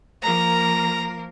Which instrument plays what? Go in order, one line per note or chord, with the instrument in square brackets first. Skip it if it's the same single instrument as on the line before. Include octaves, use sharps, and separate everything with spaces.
[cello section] F3 A#3 A#4 [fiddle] A#5